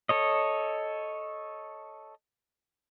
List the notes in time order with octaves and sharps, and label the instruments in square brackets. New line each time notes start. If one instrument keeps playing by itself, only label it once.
[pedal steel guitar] A4 C#5 D#5